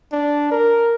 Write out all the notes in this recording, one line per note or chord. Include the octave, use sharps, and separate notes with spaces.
D4
A#4